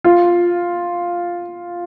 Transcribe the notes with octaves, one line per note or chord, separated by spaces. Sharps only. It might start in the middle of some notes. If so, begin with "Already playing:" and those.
F4